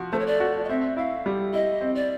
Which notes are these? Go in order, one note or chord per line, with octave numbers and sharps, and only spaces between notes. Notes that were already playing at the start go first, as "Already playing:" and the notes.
Already playing: F3 F#4
A3 C5
C#5
D5
F#4
D#5
C4 E5
E4 F5
G3
E4 D#5
C4
D5